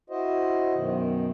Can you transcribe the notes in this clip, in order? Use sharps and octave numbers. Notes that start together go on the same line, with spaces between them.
E4 F#4 C5 D#5
F#2 B2 D#3